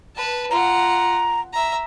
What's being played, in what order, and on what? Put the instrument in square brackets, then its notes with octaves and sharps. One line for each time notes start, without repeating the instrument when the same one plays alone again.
[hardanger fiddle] B4 A5
[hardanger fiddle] F4 F#5 [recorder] A#5
[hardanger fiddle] E5 A#5